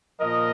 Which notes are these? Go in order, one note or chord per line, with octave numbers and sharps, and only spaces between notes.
A#2 F3 A#4 D#5